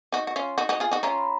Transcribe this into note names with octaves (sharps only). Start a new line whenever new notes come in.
D#4 F#4
F#4
C#4 F4
D#4 F#4
D#4 F#4
F4 G#4
D#4 F#4
C#4 F4 A#5
B5